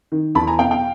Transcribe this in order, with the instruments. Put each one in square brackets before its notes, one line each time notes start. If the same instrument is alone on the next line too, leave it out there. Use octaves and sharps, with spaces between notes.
[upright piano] D#3
E2 A5 B5
G#5 A#5
B2 F5 G5
F5 G5